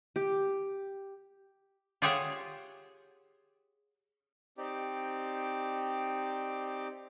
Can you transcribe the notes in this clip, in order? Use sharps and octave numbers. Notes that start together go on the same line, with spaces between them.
G4
F4 G4 G#4 C#5 E5 F#5
C4 D#4 G4 D5